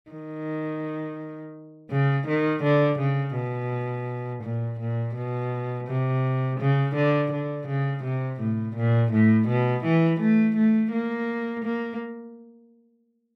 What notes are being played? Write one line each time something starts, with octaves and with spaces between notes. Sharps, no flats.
D#3
C#3
D#3
D3
C#3
B2
A#2
A#2
B2
C3
C#3
D3
D3
C#3
C3
A2
A#2
A2
B2
E3
A3
A3
A#3
A#3